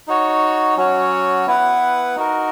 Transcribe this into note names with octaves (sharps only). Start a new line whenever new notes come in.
D#4 F#4 C#5
F#3 C#4 F#4 C#5
B3 E4 B4 F#5
D#4 F#4 A#4